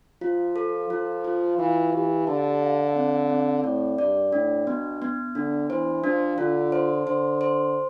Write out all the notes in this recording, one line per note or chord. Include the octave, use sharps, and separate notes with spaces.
F3 F4
A4
F3 F4
F4
E3 F5
E3 G4
D3 A5
F5
C4
C4
A2 D5
G2 D5
A2 D4
B2 B3
B3
D3 D4
E3 C5
F3 D4
D3 F4
C5
D3 C5
C5